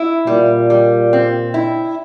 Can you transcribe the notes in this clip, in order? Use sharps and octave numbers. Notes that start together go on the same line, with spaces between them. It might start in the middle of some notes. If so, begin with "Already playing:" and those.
Already playing: E4
A#2 G3
G3
C4
E4